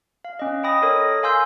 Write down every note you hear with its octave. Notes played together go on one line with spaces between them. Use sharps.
F5
C#4 D#5
D#5 G5 B5 D#6 A#6
A4 A#4 C#5 D#6
A#6
F5 G#5 C6 E6 G6